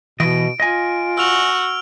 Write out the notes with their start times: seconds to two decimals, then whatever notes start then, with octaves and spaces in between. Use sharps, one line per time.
0.20 B2 E3 D#5 D7
0.60 F4 D#5 G#5
1.18 F#4 E6 F6 F7